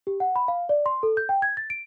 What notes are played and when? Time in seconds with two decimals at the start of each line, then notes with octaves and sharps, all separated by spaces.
0.07 G4
0.20 F#5
0.36 B5
0.48 F5
0.69 D5
0.86 C6
1.03 A4
1.17 G6
1.29 G5
1.42 G#6
1.57 A6
1.70 D7